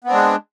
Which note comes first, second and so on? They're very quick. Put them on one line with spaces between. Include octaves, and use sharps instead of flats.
B3 C4 D4 G#3